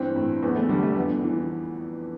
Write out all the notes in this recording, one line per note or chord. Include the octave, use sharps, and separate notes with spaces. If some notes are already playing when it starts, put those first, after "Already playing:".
Already playing: G2 E3 C4
A2
E2 B3
A3
D3 G3
A3
F2 B3
E3